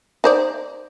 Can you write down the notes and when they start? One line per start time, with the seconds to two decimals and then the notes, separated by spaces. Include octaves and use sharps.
0.24 D#4 C5 D5